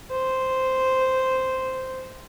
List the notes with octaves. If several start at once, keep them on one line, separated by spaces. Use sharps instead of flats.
C5